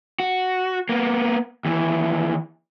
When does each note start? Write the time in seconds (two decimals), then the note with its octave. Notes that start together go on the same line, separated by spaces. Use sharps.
0.20 F#4
0.89 A#3 B3
1.65 D#2 E3